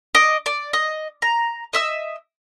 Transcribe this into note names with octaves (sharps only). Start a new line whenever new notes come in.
D#5 D6
D5
D#5
A#5
D#5 E5 E6